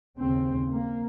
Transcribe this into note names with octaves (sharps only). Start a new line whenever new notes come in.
D#2 C#3 C4
A#3